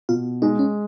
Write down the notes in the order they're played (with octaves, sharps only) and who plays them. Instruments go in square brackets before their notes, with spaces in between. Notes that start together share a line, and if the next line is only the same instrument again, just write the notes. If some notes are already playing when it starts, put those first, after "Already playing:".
[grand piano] B2 [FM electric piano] F4
[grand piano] G#3 [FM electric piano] D#4
[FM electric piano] C#4